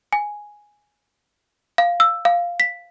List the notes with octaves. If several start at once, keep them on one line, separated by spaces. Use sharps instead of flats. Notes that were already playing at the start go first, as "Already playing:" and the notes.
G#5
F5
E6
F5
B6